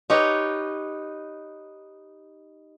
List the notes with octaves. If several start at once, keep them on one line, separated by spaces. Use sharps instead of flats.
D#4 G4 B4 C#5 D#5